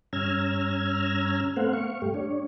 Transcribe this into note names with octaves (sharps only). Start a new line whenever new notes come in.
G2 C#4 A#5 E6 F6 G#6
A3 B3 C4 C5 F5 F#5
F5 C#6
G2 A3 G4
D4 C#5